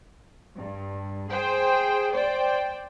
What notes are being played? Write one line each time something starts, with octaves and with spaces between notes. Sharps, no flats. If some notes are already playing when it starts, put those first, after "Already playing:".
G2
G#4 C5 G5
C5 D5 G5